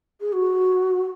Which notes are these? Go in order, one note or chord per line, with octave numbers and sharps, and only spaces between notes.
G#4
F#4